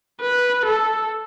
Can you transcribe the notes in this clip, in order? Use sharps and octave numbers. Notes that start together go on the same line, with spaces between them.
B4
A4